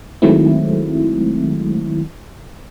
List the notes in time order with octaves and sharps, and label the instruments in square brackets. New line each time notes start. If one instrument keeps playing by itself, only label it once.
[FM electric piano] D#3 F#3 G#3 A3 C4 E4